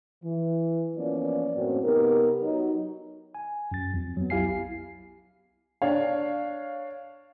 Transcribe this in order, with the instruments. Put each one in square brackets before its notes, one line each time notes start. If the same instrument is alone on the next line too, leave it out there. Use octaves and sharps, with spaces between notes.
[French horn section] E3
E3 F3 A#3 B3 C#4 D5
F#2 A2 A#3 C4 C#4 F#4
C3 B3 D#4 G4 A#4
F#3 D#4
[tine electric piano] G#5
F#2 A6
F2
F#3 B3
B1 E4 G4 F5 G#5 C7
[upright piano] D4 C#5 F5